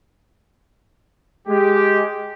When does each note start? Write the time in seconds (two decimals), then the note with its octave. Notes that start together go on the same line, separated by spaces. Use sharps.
1.48 G#3 G4